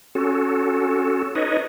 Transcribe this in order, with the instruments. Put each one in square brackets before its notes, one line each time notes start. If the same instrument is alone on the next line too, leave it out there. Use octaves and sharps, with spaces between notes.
[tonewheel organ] C#4 F#4 A4
D#4 B4 C#5 D#5